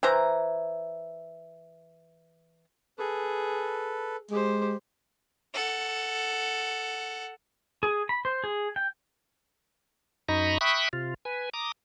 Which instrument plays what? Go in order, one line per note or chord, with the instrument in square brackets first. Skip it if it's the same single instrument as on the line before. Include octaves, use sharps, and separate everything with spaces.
[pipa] E3 C5 A#5
[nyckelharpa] G#4 [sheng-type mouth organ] A4 B4
[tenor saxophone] G#3 [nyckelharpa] G4 C5
[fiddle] A4 F#5
[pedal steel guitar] G#4
B5
C5
G#4
G5
[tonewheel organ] F#2 D#4 D#5 A#5 B5 C#6
E5 G5 B5 C#6 D#6 F#6
C3 F4
B4 G#5
A#5 D6 D#6